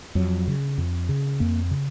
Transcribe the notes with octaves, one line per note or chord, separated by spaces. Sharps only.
F2 F#3
C#3
F2
C#3
F2 A#3
C#3